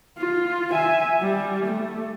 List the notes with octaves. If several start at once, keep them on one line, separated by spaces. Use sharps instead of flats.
F4
E5 G#5
G3
A3